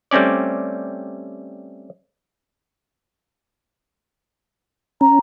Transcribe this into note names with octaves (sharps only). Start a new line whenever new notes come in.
G3 A3 C4 C#4 D5
C#4 A#5